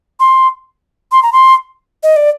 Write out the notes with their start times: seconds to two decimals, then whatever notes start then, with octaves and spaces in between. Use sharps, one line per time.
0.20 C6
1.12 C6
1.23 A#5
1.32 C6
2.03 D#5
2.16 D5